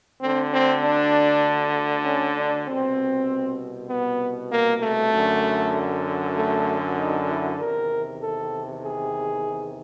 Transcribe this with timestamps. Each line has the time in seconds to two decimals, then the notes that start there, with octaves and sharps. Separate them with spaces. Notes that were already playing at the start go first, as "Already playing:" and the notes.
0.20 D2 D3 C4
0.52 C4
0.83 D4
2.05 C#4
2.36 D4
2.67 C2 B2 C4
3.90 B3
4.51 A#3
4.82 A3
5.13 F#2 D3
6.36 A3
6.98 D#4
7.29 E4
7.59 E2 C3 D#3 A#4
8.20 A4
8.83 G#4